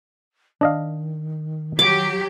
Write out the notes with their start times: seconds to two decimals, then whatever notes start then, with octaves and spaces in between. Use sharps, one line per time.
0.61 D#3 D4 D#5 F5
1.79 F#3 G4 D6